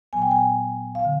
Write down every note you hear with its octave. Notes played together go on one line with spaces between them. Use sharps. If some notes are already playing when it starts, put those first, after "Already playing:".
A#2 F#3 B3 G#5
G5
G#5
F5
D3